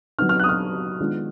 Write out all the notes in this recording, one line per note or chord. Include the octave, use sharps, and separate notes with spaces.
F#3 B3 D#4 F6
F6
F#6
D#6
F6
D#3 G#3 B3 D4 F4